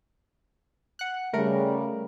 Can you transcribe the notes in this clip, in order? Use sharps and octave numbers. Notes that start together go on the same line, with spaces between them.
F#5 F#6
C#3 G3 A3 A#4